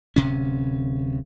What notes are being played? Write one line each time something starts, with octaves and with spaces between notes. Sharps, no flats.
D1 C3 C#4